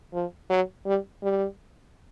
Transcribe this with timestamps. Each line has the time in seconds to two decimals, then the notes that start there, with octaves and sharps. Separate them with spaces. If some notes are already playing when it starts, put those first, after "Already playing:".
0.14 F3
0.50 F#3
0.86 G3
1.23 G3